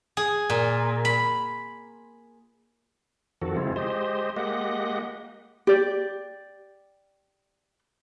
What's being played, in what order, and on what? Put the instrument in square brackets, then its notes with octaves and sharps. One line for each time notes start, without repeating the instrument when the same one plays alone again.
[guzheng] G#4
A#2
B5
[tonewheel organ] F2 D#3 F3 F#4 A4
C#3 G#3 C4 E4 F4
G#3 G4 C5 D#5
G#3 A#3 G4 D#5 F#5
[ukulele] G4 D5